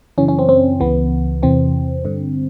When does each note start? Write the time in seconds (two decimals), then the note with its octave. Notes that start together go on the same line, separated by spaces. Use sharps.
0.18 F#2 C#3 E3 C#4
0.28 C#4
0.39 C4
0.49 C4
0.80 C#2 C#3 E3 B3
1.43 E2 C3 E3 C4
2.05 G2 D3